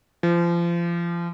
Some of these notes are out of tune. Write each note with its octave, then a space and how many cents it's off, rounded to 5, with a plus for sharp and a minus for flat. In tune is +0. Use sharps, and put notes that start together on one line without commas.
F3 -30